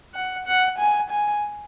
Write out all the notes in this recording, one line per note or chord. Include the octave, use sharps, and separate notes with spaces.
F#5
F#5
G#5
G#5